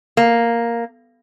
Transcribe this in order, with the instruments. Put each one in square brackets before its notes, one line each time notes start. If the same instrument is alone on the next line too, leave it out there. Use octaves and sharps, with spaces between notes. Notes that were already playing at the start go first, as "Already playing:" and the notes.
[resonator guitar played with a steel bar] A#3